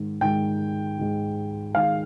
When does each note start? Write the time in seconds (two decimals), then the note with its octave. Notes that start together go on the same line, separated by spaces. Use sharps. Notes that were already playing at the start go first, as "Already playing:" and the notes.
Already playing: G#2 D#3 G#3
0.21 G#2 D#3 G#3 G5
0.98 G#2 D#3 G#3
1.75 G#2 D#3 G#3 F5